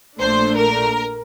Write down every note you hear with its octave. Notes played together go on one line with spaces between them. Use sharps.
A#1 A#2 A3 D4 C5
A#4